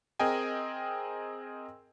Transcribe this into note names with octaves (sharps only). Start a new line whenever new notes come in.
C4 G#4 A#4 D#5 G5 G#5